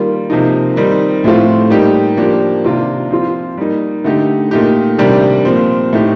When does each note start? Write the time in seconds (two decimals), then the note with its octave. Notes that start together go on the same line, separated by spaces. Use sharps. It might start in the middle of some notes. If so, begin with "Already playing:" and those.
Already playing: D#3 G3 A#3 F4
0.30 C3 F3 A#3 D#4
0.76 D#3 G3 C4 D#4
1.24 A2 F3 A3 C4 F4
1.70 G3 A#3 D#4 G4
2.17 F3 A#3 D4 G4
2.64 C3 D#3 A#3 D4 F4
3.11 F3 C4 F4
3.57 G3 A#3 D#4
4.04 D3 A3 D#4 G4
4.51 A#2 A3 D#4 G4
4.98 C3 D#3 G3 D4 G4
5.45 A#2 F3 C4
5.93 A2 A3 D#4 G4